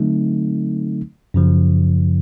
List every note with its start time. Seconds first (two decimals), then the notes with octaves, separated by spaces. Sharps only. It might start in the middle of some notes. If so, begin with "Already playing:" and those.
Already playing: D3 F#3 A3 C4 D#4
1.34 F#2 C#3 F3